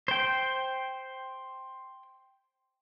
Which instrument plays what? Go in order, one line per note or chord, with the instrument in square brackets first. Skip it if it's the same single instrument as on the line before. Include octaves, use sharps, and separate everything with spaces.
[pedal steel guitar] C5 G5